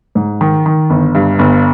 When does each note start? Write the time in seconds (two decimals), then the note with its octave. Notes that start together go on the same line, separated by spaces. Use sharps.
0.15 G#2
0.41 D#3
0.66 D#3
0.90 G1
1.15 G2
1.39 G1